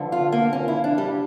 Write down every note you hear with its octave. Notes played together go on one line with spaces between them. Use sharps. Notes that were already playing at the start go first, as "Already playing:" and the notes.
Already playing: G2 D3 F3
F4
A#3
C#4
E4
D4
G3